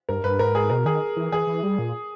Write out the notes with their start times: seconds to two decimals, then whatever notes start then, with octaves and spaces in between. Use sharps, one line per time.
0.09 G2 A#4
0.24 G2 B4
0.39 G#2 A#4
0.55 G#4
0.70 B2 A#4
0.85 D#3 G#4
1.16 E3
1.32 E3 G#4
1.47 E3
1.63 G3
1.79 A#2